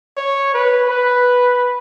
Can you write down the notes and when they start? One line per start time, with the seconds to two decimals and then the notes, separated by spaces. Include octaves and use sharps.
0.17 C#5
0.54 B4
0.90 B4